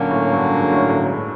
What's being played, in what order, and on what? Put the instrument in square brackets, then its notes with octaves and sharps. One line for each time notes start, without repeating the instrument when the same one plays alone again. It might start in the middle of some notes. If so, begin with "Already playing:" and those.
Already playing: [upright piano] A#2 [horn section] D3 F#3 A#3 C#4 F#4
[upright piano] A2
G2
G#2
A2
A2
G#2